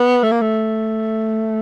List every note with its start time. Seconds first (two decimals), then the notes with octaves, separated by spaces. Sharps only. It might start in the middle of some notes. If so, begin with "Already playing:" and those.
Already playing: B3
0.23 A3
0.32 A#3
0.41 A3